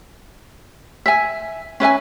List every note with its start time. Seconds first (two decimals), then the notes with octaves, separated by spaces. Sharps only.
1.06 E5 G#5
1.80 C#4 B4 E5 G#5